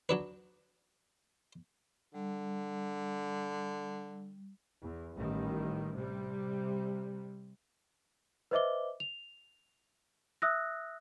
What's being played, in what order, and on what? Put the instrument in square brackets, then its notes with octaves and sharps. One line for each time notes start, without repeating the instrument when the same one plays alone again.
[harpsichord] F#3 D4 B4
[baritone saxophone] D3 [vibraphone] G3
[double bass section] E2
A1 D#3 G3
C3 G3
[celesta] B4 C5 D#5 E5 D6 G7
F7
E5 D#6 E6 F#6 A#6